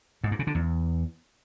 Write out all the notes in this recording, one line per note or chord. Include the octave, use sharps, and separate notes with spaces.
G#2
G2
C#3
D3
E2